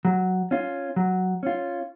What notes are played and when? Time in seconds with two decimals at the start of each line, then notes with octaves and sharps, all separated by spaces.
0.05 F#3
0.51 C#4 F4
0.96 F#3
1.43 C#4 F4